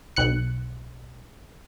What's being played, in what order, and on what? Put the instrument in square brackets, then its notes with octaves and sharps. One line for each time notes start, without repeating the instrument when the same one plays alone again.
[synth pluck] B1 F#6 C#7